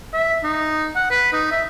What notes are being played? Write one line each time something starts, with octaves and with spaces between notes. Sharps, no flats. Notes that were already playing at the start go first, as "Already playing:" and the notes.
E5
D#4
F#5
B4
D#4
E5